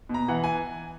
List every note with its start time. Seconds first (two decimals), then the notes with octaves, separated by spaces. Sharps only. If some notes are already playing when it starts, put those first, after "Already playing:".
0.09 B2 A#5
0.28 E3 F#5
0.44 G#5